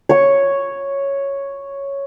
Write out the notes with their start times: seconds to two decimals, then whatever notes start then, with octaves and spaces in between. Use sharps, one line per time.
0.09 C#5 C#6